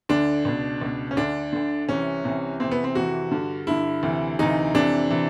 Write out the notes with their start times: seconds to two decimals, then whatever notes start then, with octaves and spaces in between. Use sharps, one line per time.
0.09 D2 D3 D4
0.45 C#2 B2
0.81 C#2 B2
1.11 C#4
1.16 D2 D3 D4
1.53 D2 D3
1.89 C2 C3 E3 C#4
2.24 C2 C3 E3
2.60 F2 C3 E3 C4
2.71 B3
2.84 C4
2.95 F2 C3 E3 F#4
3.31 G2 D3
3.67 G2 D3 E4
4.03 D2 C3 E3
4.39 D2 C3 E3 D#4
4.74 F2 C3 E3 D4
5.10 C3 E3